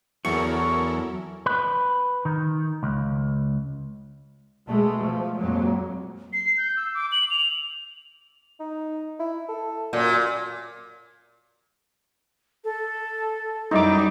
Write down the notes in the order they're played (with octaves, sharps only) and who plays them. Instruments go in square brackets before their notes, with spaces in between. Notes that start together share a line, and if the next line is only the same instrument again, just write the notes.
[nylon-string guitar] E2 [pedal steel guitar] F#3 [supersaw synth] E4 A4 A#4 [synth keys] C#6
[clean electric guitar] B4
D#3
C#2
[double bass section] B2 G#3 A3
F3
F2 A#2 F#3 G#3
[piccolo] C7
G6
E6
D6
F#7
F7
[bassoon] D#4
E4
A4
[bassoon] F#2 [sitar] A#2
[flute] A4
[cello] F#2 G3 [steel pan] D#4 E4 D6